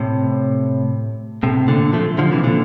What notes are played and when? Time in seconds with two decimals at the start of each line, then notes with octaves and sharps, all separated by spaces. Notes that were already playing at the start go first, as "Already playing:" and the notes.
Already playing: A2 C3
1.43 A2 C3
1.68 A#2 D3
1.93 F3 A3
2.18 D3 F3
2.31 C3 E3
2.44 A#2 D3